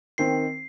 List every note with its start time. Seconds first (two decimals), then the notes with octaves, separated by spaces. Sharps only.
0.18 D#3 C4 C7